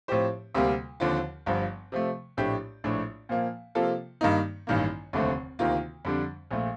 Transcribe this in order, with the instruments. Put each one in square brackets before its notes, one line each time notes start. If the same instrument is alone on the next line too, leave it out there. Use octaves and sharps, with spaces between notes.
[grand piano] A2 F3 C4 G4 C5
D2 C3 G3 A#3
D#2 D3 F3 C4 F4
G1 G2 F3
C3 F3 A3
A#1 A2 A3 D4 G4
A#1 A2 A3 D4
A#2 F3 A#3
C3 F3 A#3 F4 A4
G2 D#3 A#3 D#4
A1 G2 D#3 A#3
F1 D#2 D3 A3 C4
D2 C3 D#3 A#3 F4
F2 D3 G3 D4
A#1 A#2 A3